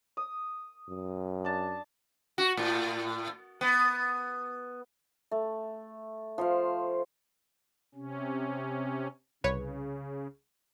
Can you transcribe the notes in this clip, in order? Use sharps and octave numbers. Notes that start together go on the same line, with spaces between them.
D#6
F#2
D4 A5
F#4
A2
B3
A3
F3 C5 F5
C3 C#4
C2 C#3 B4 C#5